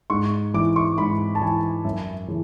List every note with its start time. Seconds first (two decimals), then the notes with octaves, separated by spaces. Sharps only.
0.10 G#2 C#6
0.54 E3 D6
0.76 C#6
0.98 G#2 B5
1.35 A5
1.41 E3 G#5
1.85 F#2 E5
2.28 C#3 E3